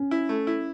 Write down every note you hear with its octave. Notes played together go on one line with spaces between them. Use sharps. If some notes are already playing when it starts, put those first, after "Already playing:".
Already playing: C#4
E4
A3
E4